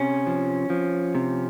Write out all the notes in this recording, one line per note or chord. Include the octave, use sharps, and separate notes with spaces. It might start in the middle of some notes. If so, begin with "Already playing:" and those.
Already playing: C3 C#4
F3
F3
C3